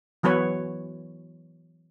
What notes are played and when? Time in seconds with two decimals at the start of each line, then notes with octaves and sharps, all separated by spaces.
0.23 E3 F#3 B3 B4 C#5